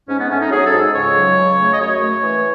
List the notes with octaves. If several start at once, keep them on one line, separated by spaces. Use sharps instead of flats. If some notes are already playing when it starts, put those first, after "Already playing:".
G#2 C#4
B3
A3 C#4
D#4
F#3 G#4
A4
G#2
C#2 C#5
F#3
C#3
A3
D#5
F#2 C#5
A3
E3